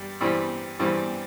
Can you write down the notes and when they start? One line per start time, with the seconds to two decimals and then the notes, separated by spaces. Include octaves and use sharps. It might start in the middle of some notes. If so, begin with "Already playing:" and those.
Already playing: G2 G3
0.21 G2 E3 G3 C4
0.79 G2 E3 G3 C4